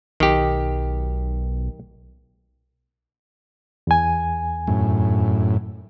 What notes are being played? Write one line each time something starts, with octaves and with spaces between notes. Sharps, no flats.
B1 D#3 G4
E2 G#5
F#2 A2